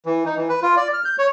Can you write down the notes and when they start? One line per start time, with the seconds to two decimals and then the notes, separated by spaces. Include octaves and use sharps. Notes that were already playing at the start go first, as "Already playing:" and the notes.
0.06 E3
0.26 D#4
0.37 E3
0.49 B4
0.63 F4
0.77 D5
0.94 F6
1.05 G6
1.19 C#5